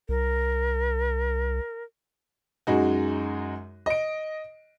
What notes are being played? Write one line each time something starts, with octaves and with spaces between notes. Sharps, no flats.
C2 A#4
F#2 G#3 D#4 F#4
D#5 D7